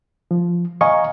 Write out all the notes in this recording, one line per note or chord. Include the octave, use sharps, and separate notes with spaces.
F3
D#5 F5 G#5 A#5 C#6